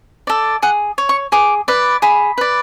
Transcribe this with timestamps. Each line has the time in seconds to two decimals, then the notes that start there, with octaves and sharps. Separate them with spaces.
0.27 A4 D5
0.62 G#4 F#5
0.98 C#5
1.09 C#6
1.32 G#4 D6
1.68 B4 D5
2.02 G#4 B5
2.38 B4 D5